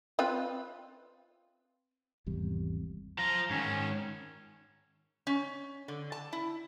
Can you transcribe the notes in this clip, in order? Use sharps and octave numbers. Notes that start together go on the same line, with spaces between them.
C4 F4 B4
G#1 E2 C3 G3
F3 F4 A#5
G#2 D#3 C#4
C#4
D3
A5
E4